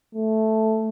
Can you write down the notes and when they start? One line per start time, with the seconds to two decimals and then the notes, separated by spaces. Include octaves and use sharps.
0.15 A3